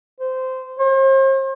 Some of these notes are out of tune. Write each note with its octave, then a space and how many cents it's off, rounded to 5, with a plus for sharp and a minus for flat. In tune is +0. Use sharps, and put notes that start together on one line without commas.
C5 -15
C5 +40